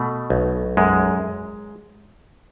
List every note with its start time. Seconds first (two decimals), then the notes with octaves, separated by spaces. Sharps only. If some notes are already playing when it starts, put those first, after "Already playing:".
Already playing: B2 A3
0.30 B1
0.77 F#2 G#3